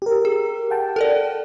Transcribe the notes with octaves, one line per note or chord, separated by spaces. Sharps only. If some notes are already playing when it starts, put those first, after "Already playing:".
G4 A#4
G#4
F#5 G5 A5
A4 A#4 D5